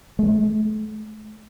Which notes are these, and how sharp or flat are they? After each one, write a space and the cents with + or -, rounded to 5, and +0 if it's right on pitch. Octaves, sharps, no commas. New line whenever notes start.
A3 -40